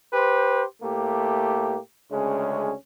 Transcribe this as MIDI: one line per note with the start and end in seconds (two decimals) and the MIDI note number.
0.14 0.64 67
0.14 0.64 71
0.14 0.64 72
0.82 1.78 45
0.82 1.78 57
0.82 1.78 58
0.82 1.78 67
2.11 2.73 38
2.11 2.73 49
2.11 2.73 56
2.11 2.73 61